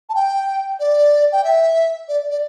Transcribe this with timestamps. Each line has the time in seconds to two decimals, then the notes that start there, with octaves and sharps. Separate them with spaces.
0.09 A5
0.15 G5
0.80 D5
1.32 G5
1.44 E5
2.08 D5
2.30 D5